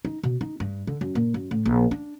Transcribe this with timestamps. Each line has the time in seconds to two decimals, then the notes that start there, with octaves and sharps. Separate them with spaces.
0.05 D#4
0.23 B2
0.41 D#4
0.60 G2
0.87 D3
1.01 F#2
1.15 A#2
1.34 F#2
1.51 A2
1.66 A#1
1.91 D4